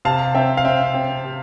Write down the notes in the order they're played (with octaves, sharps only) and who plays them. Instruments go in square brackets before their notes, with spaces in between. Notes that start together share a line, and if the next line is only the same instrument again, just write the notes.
[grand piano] C3 F5 A5
C4 E5 G5
F5
C4 E5 G5
C4
C3